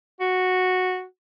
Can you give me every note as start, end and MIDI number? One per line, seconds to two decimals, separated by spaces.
0.20 1.03 66